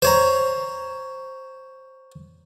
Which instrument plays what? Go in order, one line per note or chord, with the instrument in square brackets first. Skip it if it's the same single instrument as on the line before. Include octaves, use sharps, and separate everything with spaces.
[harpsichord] C5 C#5 A#5